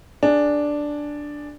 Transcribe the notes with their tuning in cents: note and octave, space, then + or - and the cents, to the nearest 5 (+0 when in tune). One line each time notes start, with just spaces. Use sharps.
D4 +0 G#4 +0